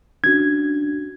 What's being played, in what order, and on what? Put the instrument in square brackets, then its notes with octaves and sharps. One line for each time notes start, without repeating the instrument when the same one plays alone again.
[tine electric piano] C#4 D4 F#4 [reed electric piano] G#6